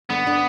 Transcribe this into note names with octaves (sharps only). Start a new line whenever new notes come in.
D3 B3 D4
D3 D4